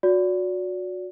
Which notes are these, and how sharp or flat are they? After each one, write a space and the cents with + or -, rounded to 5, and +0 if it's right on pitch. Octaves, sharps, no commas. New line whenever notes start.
F#4 -25 D5 -30